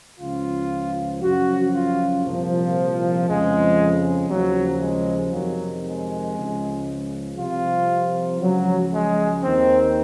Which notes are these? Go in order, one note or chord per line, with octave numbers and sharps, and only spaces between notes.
C#2 C#3 F3 F4
F#2 C#3 F3 F#4
F4
C2 A#2 F3
F2 C#3 F3 G#3
D#2 C#3 F3 F#3
G#3
F2 C3 D#3 F#3
G#3
C#2 C#3 F3
C2 C3 F3 F4
C#2 C#3 F3 F#3
G#3
D#2 D#3 C4